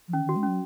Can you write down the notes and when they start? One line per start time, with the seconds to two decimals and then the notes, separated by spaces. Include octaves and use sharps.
0.08 F3
0.13 D#3 C#4
0.25 D#3 F#4
0.36 G#3
0.43 F#3 C#4